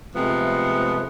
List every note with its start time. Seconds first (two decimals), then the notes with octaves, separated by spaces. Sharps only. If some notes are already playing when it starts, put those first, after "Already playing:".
0.14 C3 F3 G#3 A3 B3